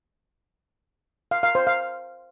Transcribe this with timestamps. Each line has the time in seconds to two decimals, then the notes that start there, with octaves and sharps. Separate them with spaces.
1.31 F5
1.43 F5
1.55 C5
1.67 F5